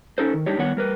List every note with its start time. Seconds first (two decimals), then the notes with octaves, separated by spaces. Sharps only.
0.18 C#4 D#4 A4 C5
0.34 D#3
0.46 G3 D4 D#4 G4 C#5
0.58 D#3 G3 B3 C#5 F#5
0.77 G3 A#4 B4